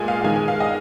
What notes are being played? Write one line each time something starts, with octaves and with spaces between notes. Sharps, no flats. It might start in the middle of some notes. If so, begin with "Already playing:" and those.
Already playing: A#2 G#3 G#5
F5
D#3 G#3 G#5
G#5
F5
D#5